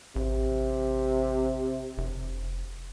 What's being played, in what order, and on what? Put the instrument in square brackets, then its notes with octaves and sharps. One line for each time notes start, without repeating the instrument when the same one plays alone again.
[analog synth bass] A1 [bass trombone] C3
[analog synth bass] F1